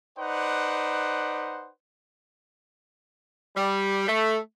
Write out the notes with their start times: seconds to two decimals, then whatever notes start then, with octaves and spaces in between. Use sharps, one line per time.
0.18 D#4 B4 C5 D5 F#5
3.56 G3
4.08 A3